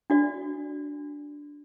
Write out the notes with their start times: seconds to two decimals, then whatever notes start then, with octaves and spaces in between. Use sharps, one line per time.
0.10 D4 F#4 D5